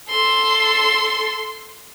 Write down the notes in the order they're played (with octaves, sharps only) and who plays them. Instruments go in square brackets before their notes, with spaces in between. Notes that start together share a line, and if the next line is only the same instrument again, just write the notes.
[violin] A4 C6